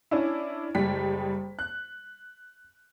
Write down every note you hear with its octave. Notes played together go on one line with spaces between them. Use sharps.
C#4 D4 E4
F#1 G3 G#3 G5 B6
F#6